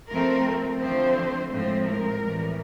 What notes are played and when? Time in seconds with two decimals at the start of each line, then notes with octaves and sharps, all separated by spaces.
0.10 F3 A3 C4 A#4
0.80 D3 F3 A3 C4 C5
1.51 A2 F3 G#3 C4 C5
1.86 A#4
2.20 A2 E3 G3